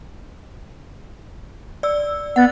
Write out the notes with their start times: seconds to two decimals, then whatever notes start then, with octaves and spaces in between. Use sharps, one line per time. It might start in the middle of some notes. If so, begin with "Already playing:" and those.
1.83 D5 E6
2.36 B3 F#5 A6